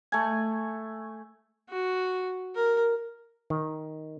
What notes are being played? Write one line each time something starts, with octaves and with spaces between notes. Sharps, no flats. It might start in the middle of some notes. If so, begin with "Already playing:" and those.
A3 G#5
F#4
A#4
D#3